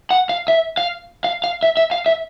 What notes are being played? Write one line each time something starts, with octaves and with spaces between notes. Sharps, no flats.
F#5
F5
E5
F5
F5
F5
E5
E5
F5
E5